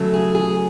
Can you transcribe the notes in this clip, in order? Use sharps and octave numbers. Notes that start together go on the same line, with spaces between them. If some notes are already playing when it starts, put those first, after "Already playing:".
Already playing: C#3 F#3 A3
G#4
G#4